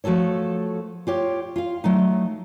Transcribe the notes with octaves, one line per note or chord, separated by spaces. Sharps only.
F3 A3 F#4 A4 C#5
F4 G4 C#5
F4 F5
F#3 A3 D#4